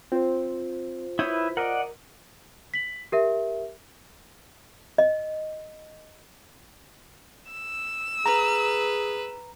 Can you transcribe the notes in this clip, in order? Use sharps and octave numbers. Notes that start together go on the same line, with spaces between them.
C4 F4 C5
E4 B4 C#5 D#6 G6
A#4 D5 D#5 F#5
B6 F#7
G4 A#4 E5
D#5
E6
G#4 B4 A#5